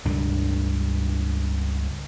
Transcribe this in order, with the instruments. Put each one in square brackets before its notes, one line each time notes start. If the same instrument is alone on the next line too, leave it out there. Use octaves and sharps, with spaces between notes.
[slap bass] C#2 G2 D4